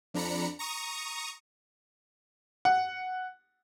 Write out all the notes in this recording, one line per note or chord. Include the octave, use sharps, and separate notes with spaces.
F2 D4 A#5 B5 C#7
A#5 C#6 D#6
F#5